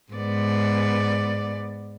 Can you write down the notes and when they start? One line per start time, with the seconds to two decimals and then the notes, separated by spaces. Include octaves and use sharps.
0.13 G#2 B3 D5